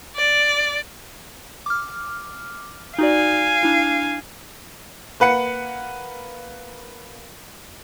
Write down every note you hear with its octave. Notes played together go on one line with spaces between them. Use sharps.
D5
D6 F6
D#4 F#4 D5 F5 G#5
D4 E4
A#3 B4 F#5 C#7